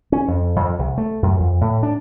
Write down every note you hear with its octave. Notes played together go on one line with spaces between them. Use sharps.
C#4
F2
F2
C2
A3
F#2
F2
A2
D4